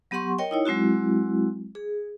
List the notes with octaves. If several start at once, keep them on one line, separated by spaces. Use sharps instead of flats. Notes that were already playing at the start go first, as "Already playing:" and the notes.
F#3 B3 G4 F#5 C6 C#6
A#4 C#5 D#5 G5
D#4 E4 C#5
F#3 G#3 C4 E4 F#4
G#4